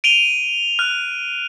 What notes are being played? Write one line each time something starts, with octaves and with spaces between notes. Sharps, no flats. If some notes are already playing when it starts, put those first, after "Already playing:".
D7 D#7 F7 G7
F6 F#6